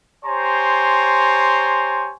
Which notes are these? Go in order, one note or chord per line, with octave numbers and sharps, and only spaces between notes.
G4 C5 C#5 G#5 A#5 C6